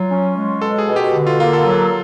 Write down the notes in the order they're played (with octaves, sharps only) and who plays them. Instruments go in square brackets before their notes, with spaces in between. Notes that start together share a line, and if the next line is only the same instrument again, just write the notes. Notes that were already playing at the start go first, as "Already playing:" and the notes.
Already playing: [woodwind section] F#3 [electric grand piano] F4
[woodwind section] C#4
G#3
[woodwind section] B2 [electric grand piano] A4
[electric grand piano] G#4
[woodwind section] B2
[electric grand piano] G4
[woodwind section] D3
[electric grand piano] F4
[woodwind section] A#3 [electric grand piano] F4
[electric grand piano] A4
[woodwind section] F#3